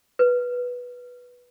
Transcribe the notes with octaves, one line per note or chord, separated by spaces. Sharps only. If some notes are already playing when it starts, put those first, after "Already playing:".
B4